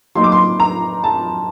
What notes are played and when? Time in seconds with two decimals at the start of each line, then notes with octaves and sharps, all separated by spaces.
0.15 F#3 A#3 D#4 C6
0.24 D6
0.32 C6
0.60 A#5
1.04 A5